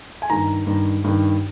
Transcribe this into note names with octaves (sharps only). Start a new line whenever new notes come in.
G#5
G2 D#3 A#5
G2 D#3
G2 D#3